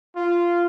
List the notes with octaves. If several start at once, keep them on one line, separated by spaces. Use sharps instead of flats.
F4